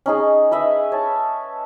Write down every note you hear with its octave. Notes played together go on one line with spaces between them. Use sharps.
C#4 D#4 G#4
B4 D#5 E5 B5
C#5 A5